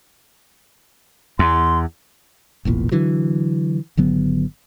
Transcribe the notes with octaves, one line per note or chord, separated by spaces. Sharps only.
E2 C6
E1 A1 E2 A#2
D3 E3 F#3
G#1 D3 F#3 B3